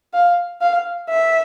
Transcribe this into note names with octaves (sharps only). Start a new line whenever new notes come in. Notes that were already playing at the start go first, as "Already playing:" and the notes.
F5
F5
E5